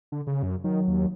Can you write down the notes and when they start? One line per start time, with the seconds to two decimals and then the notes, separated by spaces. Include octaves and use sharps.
0.12 D3
0.27 C#3
0.43 F#2
0.64 D#3 F#3
0.87 D#2